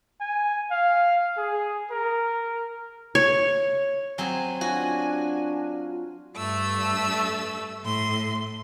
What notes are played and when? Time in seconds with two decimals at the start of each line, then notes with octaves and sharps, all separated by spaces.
0.20 G#5
0.71 F5
1.37 G#4
1.91 A#4
3.15 C#5
4.18 F#3 C4 G#5
4.61 D4 F4 F#4
6.36 G2 A3 E6
7.83 A2 C6